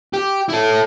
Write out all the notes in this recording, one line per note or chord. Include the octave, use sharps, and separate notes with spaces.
G4
E4 A4